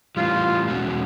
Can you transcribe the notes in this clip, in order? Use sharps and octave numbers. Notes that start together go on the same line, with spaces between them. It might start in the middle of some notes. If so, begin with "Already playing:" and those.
A2 E3 G3 F4
E2 B2 G#3 C#4 F#4